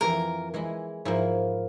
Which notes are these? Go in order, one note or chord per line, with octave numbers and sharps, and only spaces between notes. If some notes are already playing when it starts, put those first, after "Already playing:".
F2 E3 A#3 A#4
E3 G#3 E4
G#2 F3 A#3 E4